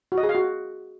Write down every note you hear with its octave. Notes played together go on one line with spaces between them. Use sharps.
F#4
D#5
G#4
F5
F#4